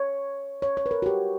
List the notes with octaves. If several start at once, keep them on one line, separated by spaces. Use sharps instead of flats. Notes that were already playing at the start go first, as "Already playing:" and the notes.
Already playing: C#5
C#5
C#5
B4
A#4
F#4
G4